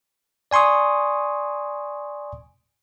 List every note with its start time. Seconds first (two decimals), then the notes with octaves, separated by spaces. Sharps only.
0.51 D5 G#5 C6 C#6 D#6